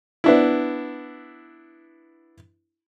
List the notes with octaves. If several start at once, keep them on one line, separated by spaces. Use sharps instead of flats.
B3 D4 E4